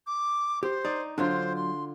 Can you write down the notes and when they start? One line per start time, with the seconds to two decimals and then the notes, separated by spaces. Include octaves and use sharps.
0.07 D6
0.63 G4 C5
0.85 D#4 D5
1.18 D3 F#3 D4 F4 C5
1.56 C6